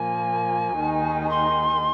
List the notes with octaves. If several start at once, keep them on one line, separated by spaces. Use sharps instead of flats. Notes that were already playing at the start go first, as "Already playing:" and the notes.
Already playing: A#2 F3 A#3 G#5
D#2 D#3 G#3 D#4
C6